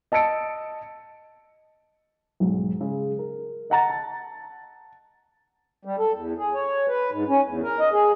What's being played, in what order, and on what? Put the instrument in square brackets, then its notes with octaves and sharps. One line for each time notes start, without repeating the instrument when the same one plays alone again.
[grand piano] D#5 A5 E6 C#7 D7
B1 G#2 F#3
C#3 G#3
A#4
D#5 F#5 A#5 A6
A5
[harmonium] G3
A4
E2
G#4
C#5
B4
G#2
C#4
E2
A#4
D#5
G#4